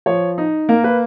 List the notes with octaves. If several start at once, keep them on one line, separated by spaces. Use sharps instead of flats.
F3 C#5
D#4
A#3 A#4
B4